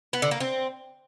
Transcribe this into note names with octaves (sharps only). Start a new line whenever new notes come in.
B3
D3
A#3
C4